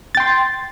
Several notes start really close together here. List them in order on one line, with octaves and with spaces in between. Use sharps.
A6 G5 C6